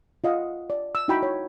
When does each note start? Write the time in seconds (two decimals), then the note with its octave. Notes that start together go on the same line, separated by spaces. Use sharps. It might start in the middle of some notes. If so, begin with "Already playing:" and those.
0.24 F4 D#5 F5 F#5
0.70 D5
0.95 E6
1.08 D#4 E4 F#4 G5 A#5 B5
1.23 C#5